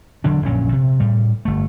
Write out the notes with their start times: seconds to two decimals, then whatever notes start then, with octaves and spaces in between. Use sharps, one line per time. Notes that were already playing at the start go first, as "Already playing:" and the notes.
0.24 E1 D3 F#3 D4
0.45 A#1 F#2 A#2 C#4
0.72 C3
1.00 A2 G3
1.45 G1 A3